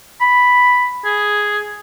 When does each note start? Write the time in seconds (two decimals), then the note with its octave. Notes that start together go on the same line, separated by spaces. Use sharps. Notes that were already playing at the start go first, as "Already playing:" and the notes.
0.21 B5
1.05 G#4